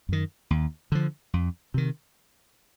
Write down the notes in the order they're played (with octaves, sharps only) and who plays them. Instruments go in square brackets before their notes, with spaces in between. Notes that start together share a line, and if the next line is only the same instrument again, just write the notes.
[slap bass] F#2 D#3
D#2
D3 F3
F2
C3 D#3